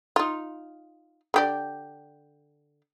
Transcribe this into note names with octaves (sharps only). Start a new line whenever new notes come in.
D#4 F4
D3 G4 D5